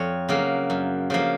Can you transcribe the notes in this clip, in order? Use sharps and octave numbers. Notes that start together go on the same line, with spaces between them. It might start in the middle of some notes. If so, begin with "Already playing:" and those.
Already playing: F2 C#5
C#3 F#3 A#3
F#2
C#3 F3 A#3